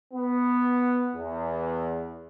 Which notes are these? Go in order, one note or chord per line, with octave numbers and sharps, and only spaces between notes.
B3
E2